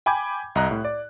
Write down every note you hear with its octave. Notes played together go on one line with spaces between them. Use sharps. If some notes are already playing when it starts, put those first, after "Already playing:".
G5 G#5 B5 D6 G6 G#6
C2 D#5 A#5 F#6
A2
D5